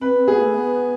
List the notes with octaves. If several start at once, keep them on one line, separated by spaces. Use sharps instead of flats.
C4 B4
C4
B3 G#4
A3
B3